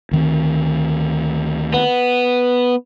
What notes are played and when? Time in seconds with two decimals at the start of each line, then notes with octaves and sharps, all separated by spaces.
0.11 D2 D#3 C4
1.74 B3